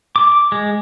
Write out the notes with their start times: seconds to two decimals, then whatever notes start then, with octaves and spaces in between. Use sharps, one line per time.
0.16 D6
0.52 G#3